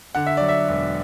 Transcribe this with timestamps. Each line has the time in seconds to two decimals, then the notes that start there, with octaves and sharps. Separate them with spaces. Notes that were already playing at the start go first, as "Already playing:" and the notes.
0.15 D3 F#5
0.26 E5
0.37 F#3 D5
0.48 E5
0.69 E1